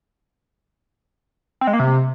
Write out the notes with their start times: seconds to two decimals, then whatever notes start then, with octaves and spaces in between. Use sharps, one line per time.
1.61 C4
1.67 G#3
1.73 A#3
1.79 C3